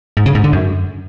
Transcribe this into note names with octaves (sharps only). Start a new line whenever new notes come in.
G#2
C#3
G#2
D3
F#2